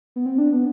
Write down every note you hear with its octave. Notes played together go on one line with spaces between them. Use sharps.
B3
C4
D4
B3